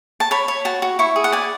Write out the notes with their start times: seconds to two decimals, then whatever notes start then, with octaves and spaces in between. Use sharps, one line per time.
0.20 A5
0.31 C#5 B5
0.48 C#5
0.65 F#4 A5
0.82 F#4
0.99 E4 C#6
1.16 G#4
1.24 F#5
1.32 D5 G#5